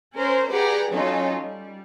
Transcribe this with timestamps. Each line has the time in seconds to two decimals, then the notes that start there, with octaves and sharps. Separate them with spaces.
0.14 C#4 A#4 C5
0.50 G4 G#4 B4 D5 F#5 A#5
0.91 F#3 C#4 D#4 F4 A4
1.40 G3